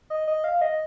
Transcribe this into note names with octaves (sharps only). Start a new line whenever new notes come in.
D#5
D#5
F5
D#5